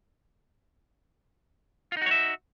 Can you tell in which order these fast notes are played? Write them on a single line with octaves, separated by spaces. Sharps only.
F4 D#4 F#4 C#5 E5